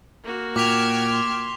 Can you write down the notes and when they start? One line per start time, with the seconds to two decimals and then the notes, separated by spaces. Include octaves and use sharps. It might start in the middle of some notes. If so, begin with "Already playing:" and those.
0.24 A#3 F#4
0.56 A#2 G5 D6 F6 G#6 B6 F7
1.11 C6